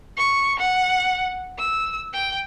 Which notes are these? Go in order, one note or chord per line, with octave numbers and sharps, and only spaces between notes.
C#6
F#5
E6
G5